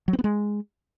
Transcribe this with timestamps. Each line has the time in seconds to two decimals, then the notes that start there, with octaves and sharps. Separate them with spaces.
0.08 F#3
0.13 C4
0.19 B3
0.24 G#3